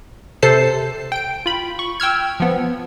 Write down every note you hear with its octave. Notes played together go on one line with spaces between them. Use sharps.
C3 A4 C5 A5 C7
G5 D7
F4 B5
C#6
G5 E6 F6 G#6
F3 B3